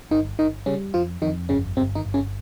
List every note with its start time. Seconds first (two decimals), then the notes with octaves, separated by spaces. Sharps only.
0.11 G1 D#3 D#4
0.39 G1 D#3 D#4
0.66 C#3 G3 C#4
0.94 F2 F3 F4
1.22 F2 D#3 D#4
1.49 G1 C#3 C#4
1.77 G1 C3 C4
1.95 D#3 D#4
2.05 G1
2.14 C#3 C#4